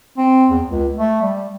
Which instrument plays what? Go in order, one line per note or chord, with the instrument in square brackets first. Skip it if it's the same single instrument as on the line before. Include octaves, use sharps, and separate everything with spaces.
[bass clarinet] C4
E2
C#2
A3
G3